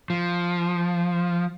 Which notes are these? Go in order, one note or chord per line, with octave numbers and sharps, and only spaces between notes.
F3